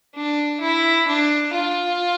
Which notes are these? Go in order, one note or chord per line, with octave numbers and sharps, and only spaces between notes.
D4
E4
D4
F4